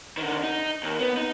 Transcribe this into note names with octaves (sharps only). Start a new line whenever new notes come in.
D3 D#3
D#4
D#2
B3
D#4